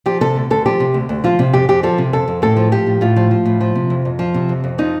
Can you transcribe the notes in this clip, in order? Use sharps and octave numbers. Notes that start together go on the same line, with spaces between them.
F3 G4
C3 A4
D2
D2 A4
F3 G4
C3
D2
D2
F3 F4
C3
F2 G4
F2 G4
F3 A4
C3
F2 A4
F2
A2 A4
F3
F3 G4
A2
A2 F4
F3
F3
A2
F3
C3
F2
F2
F3
C3
F2
F2
F3 D#4